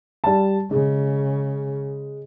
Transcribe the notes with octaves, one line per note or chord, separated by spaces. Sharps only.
G3 A5
C#3 G#3